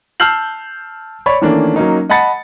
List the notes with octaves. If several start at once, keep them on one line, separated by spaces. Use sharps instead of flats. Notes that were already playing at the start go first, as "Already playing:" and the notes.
A5 E6 F6 G6 C7 F#7
C#5 D5 B5 C#6
D#3 E3 A3 A#3 C#4 D4
F#3 A#3 C#4 D#4
D#5 F#5 A5 B5 A6 C#7